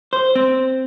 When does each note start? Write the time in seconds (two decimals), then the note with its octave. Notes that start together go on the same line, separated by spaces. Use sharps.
0.13 C5
0.35 C4